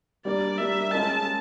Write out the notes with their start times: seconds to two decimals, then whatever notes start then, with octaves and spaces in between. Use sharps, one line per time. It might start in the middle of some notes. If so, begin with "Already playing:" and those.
0.25 G3 A#3 D4 D5
0.58 G3 A#3 D4 E5
0.91 G#3 C#4 F4 A#4 D#5 A5
1.25 G#3